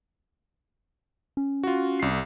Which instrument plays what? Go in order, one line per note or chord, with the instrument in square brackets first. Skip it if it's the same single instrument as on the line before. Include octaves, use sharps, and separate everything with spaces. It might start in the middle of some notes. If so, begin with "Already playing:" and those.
[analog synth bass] C#4
[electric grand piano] F4 F#4
C2 C7